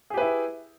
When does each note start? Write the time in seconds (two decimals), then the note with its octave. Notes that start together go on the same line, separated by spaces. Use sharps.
0.10 G#4
0.14 G4
0.17 B4
0.21 E4